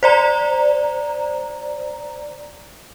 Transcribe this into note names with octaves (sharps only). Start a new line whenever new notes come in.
C5 D5 A#5